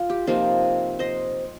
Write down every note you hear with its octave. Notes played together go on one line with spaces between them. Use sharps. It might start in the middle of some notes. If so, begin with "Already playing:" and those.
Already playing: F4
G4
C3 F3 A#3 D#4 F4
C5 D#5